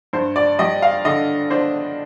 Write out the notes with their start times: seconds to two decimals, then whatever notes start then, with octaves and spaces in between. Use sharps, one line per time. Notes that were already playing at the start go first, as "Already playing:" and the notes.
0.13 G2 C5
0.36 D5
0.59 G3 D#5
0.82 F5
1.05 D3 D#5
1.50 D4 C5